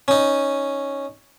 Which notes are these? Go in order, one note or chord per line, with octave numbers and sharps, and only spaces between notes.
C#4 D#4